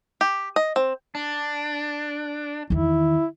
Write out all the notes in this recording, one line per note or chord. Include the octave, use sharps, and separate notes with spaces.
G4
D#5
C4
D4
E2 D#3 E4